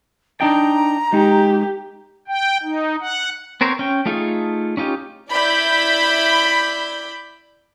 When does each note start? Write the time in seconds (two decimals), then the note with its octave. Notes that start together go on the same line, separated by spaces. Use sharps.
0.41 D4 D#4 G5 A#5
1.13 G#3 D#4 G4
2.28 G5
2.63 D#4
3.00 F#5
3.61 B3 C4 A#4 C5 C#5
3.79 C#4 G5
4.06 A3 D#4 F4 G#4 A4
4.77 C#4 D#4 F4 G4
5.30 E4 D5 B5 G6